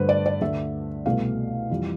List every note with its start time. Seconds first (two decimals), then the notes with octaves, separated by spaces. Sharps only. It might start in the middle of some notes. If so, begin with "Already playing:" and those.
Already playing: G2 D3 A3 B4 C5
0.09 D5
0.26 D5
0.41 D2 D3 A3 E5
1.06 C2 B2 A3 F5
1.70 F2 E3 G3